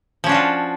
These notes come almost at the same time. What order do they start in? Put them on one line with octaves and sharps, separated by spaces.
F3 C#4 D4 F#4 F4